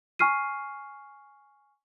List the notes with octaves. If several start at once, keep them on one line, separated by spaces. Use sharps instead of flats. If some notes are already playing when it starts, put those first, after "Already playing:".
G#5 C#6 F6 C7 D#7